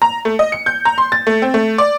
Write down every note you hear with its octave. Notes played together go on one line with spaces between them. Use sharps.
A#5
A3
D#5
C#7
G6
A#5
C6
A6
A3
C4
A3
D5